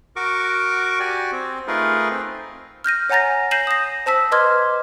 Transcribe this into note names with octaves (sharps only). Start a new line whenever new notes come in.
F#4 A#4 C#6 D6
F#4 G4 D5 G#5
C4
A3 D#4 F4 G#4 A#4 B4
C4
F6 G6 A#6 D#7
C#5 F#5 G#5 A#5 A6 A#6
G6 A#6 C7 D#7 E7 F#7
D#6 A#6
C5 A5 E6 B6
B4 D#5 C6 D6 F6 G#6